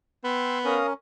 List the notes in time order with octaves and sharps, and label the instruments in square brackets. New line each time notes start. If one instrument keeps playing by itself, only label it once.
[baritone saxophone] B3 [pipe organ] G5 C6 E6
[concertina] C#4 [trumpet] A#4 [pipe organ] F5 A#5 D#6